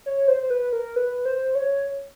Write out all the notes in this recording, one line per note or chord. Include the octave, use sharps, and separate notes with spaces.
C#5
C5
C5
B4
A#4
B4
C5
C#5